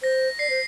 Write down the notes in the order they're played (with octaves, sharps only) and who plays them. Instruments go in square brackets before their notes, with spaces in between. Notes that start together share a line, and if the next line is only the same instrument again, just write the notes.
[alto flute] C5 [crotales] A#6
[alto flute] D5 [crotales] C7
[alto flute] C5